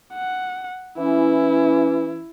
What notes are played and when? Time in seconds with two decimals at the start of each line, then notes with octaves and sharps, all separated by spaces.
0.14 F#5
0.98 E3 C#4 E4